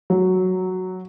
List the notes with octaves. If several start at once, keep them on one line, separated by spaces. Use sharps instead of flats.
F#3